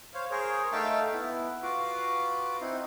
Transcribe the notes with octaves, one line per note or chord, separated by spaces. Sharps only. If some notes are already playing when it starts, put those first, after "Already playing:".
C5 C#5 F5
G#4 A#4 C5 C#5
A3 D#4 E5 F5 G5 A5
B3 E4
F4 F#4 B4 D6
C4 D#4 E4